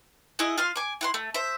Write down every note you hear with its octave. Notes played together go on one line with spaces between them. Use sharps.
E4 G#4 D#5 F#5
F4 F5 C6
G#5 D6
E4 F#5 C6
A3
C5 E5